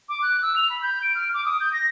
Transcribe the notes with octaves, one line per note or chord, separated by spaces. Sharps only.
D6
F#6
E6
F7
B5
G6
D7
F6
D6
D#6
G6
A#6